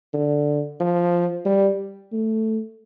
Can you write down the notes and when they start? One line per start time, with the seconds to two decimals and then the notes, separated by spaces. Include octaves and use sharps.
0.13 D3
0.80 F3
1.45 G3
2.12 A3